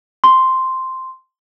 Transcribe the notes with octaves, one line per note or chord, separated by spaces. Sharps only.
C6